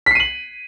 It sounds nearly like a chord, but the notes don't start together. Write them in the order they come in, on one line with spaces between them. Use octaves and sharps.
B6 C7 D#7 F#7